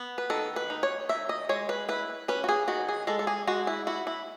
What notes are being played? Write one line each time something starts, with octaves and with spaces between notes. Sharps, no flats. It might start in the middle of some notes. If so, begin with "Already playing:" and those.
Already playing: B3
B4
D#3 A4
B4
D#4
C#5
D#3 E5
D#5
G#3 C#5
B4
E4 B4
C#4 B4
F#4
G#4
D#3 F#4
G#4
G#3 A4
A4
G#4
G#3 F#4
E4
E4 F#4
E4